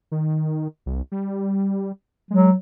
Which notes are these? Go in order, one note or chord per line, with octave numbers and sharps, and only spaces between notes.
D#3
C2
G3
F#3 G#3